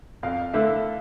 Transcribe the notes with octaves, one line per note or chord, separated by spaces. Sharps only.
F2 F5
D3 A3 E4 E5